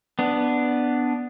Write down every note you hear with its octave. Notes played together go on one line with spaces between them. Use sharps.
B3 D4